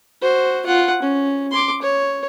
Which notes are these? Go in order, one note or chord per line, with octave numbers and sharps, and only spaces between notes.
F#4 C5
F4 F#5
C#4
C6 D6
C#5